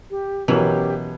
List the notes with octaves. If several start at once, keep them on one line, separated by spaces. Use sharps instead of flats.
G4
B2 E3 F#3 C#4 G4 A#4